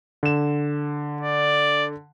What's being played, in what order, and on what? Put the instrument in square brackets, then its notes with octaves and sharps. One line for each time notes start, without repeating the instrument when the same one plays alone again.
[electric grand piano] D3 E7
[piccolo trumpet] D5